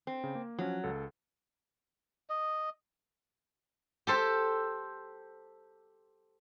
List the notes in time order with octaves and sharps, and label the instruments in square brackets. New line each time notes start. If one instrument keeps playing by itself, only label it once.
[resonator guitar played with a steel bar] C4
[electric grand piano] C#3
A#3
[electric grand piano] F3 C#4 [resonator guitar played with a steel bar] F#3
[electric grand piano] C#2 A4
[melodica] D#5
[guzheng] G4 A4 C5